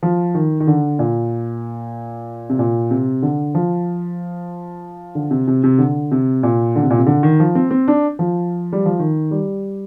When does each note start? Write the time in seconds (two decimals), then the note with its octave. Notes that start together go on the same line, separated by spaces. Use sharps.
0.03 F3
0.35 D#3
0.60 D#3
0.67 D3
0.99 A#2
2.50 C3
2.59 A#2
2.91 C3
3.22 D3
3.55 F3
5.15 D3
5.31 C3
5.48 C3
5.64 C3
5.78 D3
6.12 C3
6.43 A#2
6.76 D3
6.83 C3
6.90 A#2
6.98 C3
7.06 D3
7.23 D#3
7.40 F3
7.55 C4
7.71 C4
7.88 D4
8.19 F3
8.73 G3
8.86 F3
8.99 D#3
9.31 G3